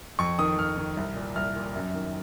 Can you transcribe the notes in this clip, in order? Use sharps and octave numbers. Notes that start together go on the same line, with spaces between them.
F2 C#6
D#3 D#6
F2 F6
D#3
C2
A#2
C2 F6
A#2
F#2
D#3